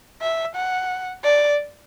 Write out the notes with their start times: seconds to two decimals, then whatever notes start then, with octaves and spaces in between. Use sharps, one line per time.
0.21 E5
0.55 F#5
1.24 D5